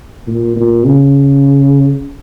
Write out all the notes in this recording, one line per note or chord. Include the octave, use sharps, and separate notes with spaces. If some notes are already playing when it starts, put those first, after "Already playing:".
A#2
A#2
C#3